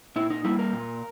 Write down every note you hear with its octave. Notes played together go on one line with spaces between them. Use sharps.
A#2 E4
D#4
G3 A#3 E4
A#4
A#2